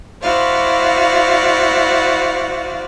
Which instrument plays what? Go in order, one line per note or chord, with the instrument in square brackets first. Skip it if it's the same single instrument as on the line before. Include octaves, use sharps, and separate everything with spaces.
[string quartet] E4 F#4 C5 D5 F5